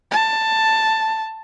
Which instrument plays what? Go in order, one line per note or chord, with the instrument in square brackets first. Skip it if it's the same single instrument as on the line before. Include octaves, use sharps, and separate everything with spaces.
[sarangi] A5